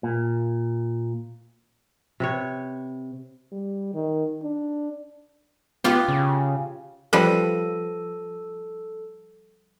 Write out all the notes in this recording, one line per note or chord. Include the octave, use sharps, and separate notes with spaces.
A#2
C3 B4 C#5
G3
D#3
D4
B3 F4 G4
C#3
F3 G3 A4 B4